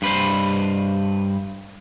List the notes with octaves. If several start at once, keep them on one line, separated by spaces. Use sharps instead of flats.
G2 B4 C5